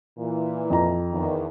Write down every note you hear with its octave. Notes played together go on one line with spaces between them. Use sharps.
A#2 E3
F2 A#5
E2 D#3